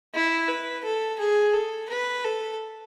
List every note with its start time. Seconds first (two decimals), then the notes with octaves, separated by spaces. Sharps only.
0.15 E4
0.48 B4
0.84 A4
1.19 G#4
1.54 A4
1.90 B4
2.24 A4